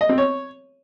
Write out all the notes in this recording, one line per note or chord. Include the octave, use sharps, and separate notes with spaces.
D#5
C4
C#5